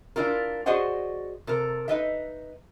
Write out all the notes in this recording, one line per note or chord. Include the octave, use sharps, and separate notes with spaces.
A#3 D4 E4 F4 A#4
F#4 G#4 C5 D5 D#5 F#5
C3 A4 A#4
D#4 B4 D#5 E5